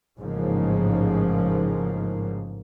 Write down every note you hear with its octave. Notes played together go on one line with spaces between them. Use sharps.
A1 G#2 C#3 F3 A#3